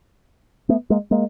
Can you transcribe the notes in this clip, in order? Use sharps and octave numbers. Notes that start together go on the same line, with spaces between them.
A3 B3
G#3 A#3
G#3 A#3